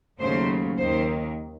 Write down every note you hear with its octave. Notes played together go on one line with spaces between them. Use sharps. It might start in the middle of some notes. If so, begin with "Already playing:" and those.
D#2 C#3 F#3 A3 C5
D#2 D#3 A#3 C5